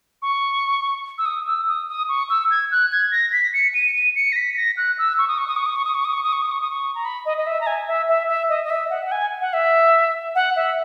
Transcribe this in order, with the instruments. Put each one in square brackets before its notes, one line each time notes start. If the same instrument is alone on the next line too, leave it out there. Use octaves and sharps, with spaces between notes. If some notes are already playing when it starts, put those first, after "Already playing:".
[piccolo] C#6
E6
D#6
E6
D#6
D#6
C#6
E6
G#6
F#6
G#6
A#6
B6
C#7
D#7
D#7
C#7
A#6
B6
A#6
F#6
E6
C#6
D#6
C#6
D#6
C#6
D#6
C#6
D#6
C#6
D#6
C#6
D#6
C#6
D#6
C#6
D#6
C#6
A#5
B5
D#5
D#5
E5
A#5
G#5
E5
E5
E5
D#5
D#5
E5
F#5
F#5
G#5
F#5
E5
F#5
E5